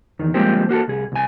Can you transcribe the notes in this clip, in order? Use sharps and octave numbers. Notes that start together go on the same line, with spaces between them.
E2 D#3
F3 G3 G#3 A#3 C4 G4
A#3 F#4 G4 A4
C2 G#4
C2 G#5